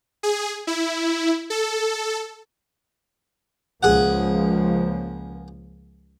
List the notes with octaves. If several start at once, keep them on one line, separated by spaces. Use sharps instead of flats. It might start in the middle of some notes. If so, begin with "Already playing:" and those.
G#4
E4
A4
C#2 F3 A#3 G#4 F#5